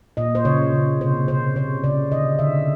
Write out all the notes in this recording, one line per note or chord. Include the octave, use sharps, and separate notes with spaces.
A#2 D#5
C5
C#3 C#5
C#3
C3 C5
C3 C5
C#3 C#5
C#3 D5
D3 D#5
D3 E5